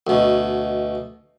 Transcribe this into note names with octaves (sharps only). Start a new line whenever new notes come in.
D2 B2